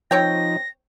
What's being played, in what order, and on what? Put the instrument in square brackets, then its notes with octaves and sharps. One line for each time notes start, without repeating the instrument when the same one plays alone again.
[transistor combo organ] F3 D#4 [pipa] C4 C#5 G5 [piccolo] A#6